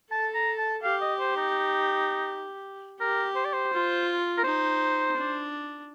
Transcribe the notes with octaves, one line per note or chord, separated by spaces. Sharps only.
A4 A5
A#5
A5
G4 F5
D#5
C5
D#4
G4 A#4
C5
D5
C5
F4
A#4
D#4 C5
D4